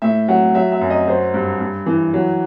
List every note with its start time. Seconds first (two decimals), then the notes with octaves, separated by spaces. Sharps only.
0.02 A2 E5
0.28 F#3 F#5
0.55 F#3 E5
0.72 E5
0.81 F#2
0.90 D#5
1.08 F#3 C5
1.34 G2
1.60 G2
1.86 E3
2.14 F#3